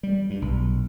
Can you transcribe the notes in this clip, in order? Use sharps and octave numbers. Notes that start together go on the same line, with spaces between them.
G3
G2
B1